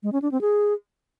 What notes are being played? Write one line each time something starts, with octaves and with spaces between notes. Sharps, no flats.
G#3
C#4
D4
C4
G#4